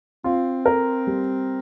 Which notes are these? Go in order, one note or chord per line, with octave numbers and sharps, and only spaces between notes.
C4 F4
A#4
G3